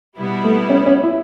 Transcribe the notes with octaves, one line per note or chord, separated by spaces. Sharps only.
B2 G3 B3 E4
A3
C#4
C#4
E4